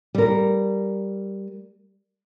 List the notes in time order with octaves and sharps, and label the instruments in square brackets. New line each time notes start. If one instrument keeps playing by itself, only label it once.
[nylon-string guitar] G3 A#4